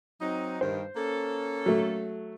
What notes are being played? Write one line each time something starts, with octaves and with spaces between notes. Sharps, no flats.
F#3 C4 D#4
G2 D#3 C5
A#3 C#4 A4
F#3 A3